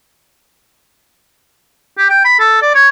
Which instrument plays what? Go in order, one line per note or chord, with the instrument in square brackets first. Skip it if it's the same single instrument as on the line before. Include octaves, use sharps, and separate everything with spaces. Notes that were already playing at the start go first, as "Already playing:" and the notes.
[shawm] G4
G5
B5
A4
D5
C#5